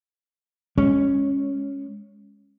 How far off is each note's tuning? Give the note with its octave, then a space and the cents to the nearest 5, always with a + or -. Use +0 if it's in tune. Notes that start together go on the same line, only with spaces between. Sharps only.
G#3 -20 C#4 +0